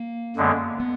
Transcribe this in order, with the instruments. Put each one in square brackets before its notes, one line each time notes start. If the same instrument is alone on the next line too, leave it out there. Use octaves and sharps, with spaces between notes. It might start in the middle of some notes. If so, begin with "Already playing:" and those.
Already playing: [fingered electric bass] A#3
[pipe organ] F#2 D3 G#3 B3
[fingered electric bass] B3